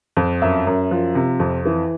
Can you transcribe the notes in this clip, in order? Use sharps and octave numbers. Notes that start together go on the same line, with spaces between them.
F2
F#2 E5
F#2
F3
C3
F2
E3